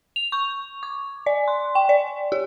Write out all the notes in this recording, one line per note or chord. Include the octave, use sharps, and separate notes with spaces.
F7
C#6
D6
D5
C6
G5
D5
G4